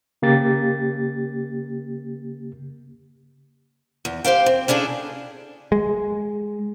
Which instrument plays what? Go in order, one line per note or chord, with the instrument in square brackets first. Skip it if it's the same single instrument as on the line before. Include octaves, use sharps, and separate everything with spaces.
[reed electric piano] C#3 A#3 G4 A6
[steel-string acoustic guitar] E2
G4 C5 F5 G5
C4
C#4 D4 E4 G#4 A4
[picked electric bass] G#3